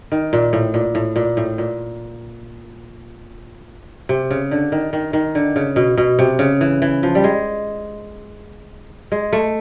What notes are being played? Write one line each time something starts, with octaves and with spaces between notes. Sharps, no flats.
D#3
A#2
A2
A#2
A2
A#2
A2
A#2
C3
C#3
D3
D#3
D#3
D#3
D3
C#3
B2
B2
C3
C#3
E3
E3
F3
G3
G#3
G#3
A3